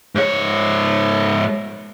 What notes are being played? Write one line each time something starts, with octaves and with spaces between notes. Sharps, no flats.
G#2 C#5